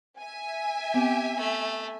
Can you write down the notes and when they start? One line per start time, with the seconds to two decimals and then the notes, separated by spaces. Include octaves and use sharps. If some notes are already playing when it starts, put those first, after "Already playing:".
0.20 E5 G#5
0.94 B3 C4 G4
1.37 A3